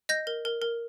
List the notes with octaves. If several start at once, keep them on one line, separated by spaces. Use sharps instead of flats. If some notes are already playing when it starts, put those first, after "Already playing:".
D#5 G6 A#6
A#4
A#4
A#4